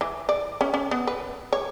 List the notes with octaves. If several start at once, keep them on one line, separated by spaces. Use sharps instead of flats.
E3
D5
C#4
C#4
B3
B4
C#5